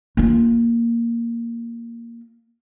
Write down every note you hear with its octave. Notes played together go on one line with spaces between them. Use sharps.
A#3 F4